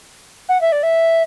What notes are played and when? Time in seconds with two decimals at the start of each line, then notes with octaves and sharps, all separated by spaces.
0.49 F#5
0.61 E5
0.72 D5
0.83 E5